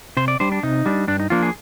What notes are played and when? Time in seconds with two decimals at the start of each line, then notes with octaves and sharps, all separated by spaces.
0.17 C3 C5
0.28 D5
0.40 G3 D4 C5
0.52 D4
0.63 C3 D#4
0.86 G3 D4
1.08 G2 D4
1.20 D#4
1.30 F3 A#3 D4 F4
1.42 G#4